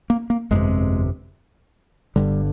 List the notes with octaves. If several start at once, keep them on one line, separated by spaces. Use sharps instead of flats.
A#3
A#3
G1 F2 C3 G#3
G1 G2 D3 G3